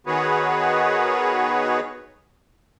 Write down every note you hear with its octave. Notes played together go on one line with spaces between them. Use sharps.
D#3 B3 F#4 G#4 B4 C#5